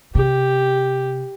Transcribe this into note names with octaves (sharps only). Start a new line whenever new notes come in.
C3 G4